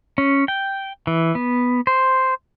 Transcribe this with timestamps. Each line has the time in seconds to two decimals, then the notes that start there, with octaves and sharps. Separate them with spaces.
0.18 C#4
0.48 G5
1.07 E3
1.35 B3
1.87 C5